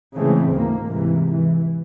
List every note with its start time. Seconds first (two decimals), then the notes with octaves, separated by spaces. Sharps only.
0.15 C#3 E3 G#3 A3 C4
0.50 D2 G#2 E3 A#3
0.86 G#2 C3 E3
1.29 E3